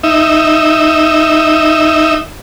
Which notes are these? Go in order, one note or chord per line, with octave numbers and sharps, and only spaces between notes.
D#4 E5